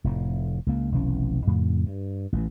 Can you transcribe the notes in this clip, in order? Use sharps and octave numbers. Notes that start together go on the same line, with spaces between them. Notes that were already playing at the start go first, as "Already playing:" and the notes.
F1 F2 A2
C#2 A#3
F1 B1 E3 C#4
F2 A2 C#3
G2
A1 E3